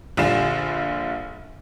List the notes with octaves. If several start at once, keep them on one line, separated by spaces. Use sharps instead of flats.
A#1 D3 G3 F4 F5 E7